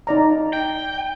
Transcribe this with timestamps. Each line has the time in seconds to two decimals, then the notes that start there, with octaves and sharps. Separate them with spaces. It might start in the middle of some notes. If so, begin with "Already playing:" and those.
0.07 D#4 D5 A#5
0.53 G5